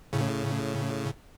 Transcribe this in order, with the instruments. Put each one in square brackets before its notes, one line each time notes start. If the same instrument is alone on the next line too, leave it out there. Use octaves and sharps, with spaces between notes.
[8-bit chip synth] A2 C#3